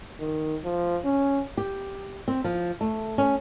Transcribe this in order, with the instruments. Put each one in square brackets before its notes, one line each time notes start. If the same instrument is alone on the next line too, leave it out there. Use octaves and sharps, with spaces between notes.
[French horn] D#3
F3
C#4
[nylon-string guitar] G4
C4
F3
A3
C#4